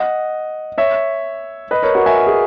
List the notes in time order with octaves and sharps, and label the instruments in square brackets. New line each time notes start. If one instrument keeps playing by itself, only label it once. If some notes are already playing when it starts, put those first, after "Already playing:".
Already playing: [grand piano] D#5 F#5
C#5 E5
B4 D#5
A#4 C#5
F#4 A#4
E5 G#5
A#4
G#4